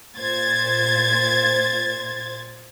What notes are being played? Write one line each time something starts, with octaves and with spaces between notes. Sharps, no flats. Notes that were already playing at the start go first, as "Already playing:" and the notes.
A#2 C5 G#6 A6